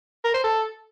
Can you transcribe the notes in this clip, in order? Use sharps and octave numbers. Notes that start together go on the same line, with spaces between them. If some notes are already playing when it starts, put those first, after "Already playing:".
A#4
C5
A4